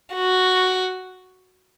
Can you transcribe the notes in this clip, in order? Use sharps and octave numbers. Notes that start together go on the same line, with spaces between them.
F#4